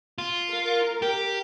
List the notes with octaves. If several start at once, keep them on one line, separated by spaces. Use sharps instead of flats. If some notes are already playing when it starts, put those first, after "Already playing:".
F4
A#4
G4